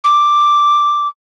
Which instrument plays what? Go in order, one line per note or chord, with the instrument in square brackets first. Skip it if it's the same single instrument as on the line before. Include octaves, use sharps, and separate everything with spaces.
[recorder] D6